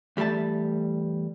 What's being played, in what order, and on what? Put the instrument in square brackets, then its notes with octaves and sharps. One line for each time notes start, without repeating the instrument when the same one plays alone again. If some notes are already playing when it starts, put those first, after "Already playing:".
[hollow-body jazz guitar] E2 G3 A3 E5 A5